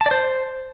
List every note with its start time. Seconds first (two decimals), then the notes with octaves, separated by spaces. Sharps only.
0.01 A5
0.06 D5
0.11 C5